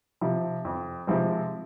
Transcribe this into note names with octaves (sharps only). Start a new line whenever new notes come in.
C3 F3
F2
C3 F3 G#3 C4